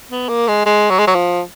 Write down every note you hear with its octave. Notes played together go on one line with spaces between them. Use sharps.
B3
A#3
G#3
G#3
F#3
G#3
F#3
F3